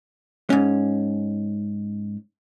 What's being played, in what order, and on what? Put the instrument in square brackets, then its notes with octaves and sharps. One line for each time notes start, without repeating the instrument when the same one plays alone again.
[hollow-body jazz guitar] G#2 C#4